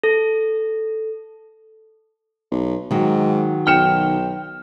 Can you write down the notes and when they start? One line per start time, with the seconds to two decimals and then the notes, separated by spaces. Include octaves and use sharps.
0.04 A4
2.51 B1
2.91 G#2 D#3 F#3
3.67 B1 G5 F6 C#7 E7